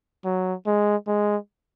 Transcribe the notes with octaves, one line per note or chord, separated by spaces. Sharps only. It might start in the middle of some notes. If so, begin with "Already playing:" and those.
F#3
G#3
G#3